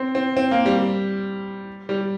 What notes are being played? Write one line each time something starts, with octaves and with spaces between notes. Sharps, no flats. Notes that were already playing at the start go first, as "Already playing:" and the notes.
Already playing: C4
C4
C4
A#3
G3
G3